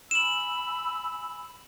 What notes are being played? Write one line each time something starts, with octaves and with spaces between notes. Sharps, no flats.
G#5 B5 E6 E7 F#7